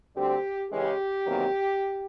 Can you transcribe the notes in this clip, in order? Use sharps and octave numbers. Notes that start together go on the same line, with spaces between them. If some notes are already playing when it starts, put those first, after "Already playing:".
D2 D3 G3 C4 G4
C#3 E3 G#3 C#4 G4
E2 C3 D#3 F#3 A#3